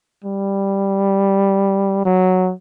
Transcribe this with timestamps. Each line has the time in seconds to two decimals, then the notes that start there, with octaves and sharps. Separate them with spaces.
0.24 G3
2.06 F#3